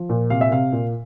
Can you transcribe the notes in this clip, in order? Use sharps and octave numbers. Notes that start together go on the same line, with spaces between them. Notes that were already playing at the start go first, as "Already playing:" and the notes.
Already playing: F3
A#2
C3 F5
E5
C3 F5
A#2